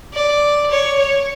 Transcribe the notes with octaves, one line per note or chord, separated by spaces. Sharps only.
D5
C#5
C#5